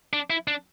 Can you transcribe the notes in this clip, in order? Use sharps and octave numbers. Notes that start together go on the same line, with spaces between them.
D4
E4
D4